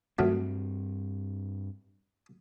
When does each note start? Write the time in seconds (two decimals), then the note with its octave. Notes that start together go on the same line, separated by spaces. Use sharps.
0.19 G2 D#3 F#3 A3 C4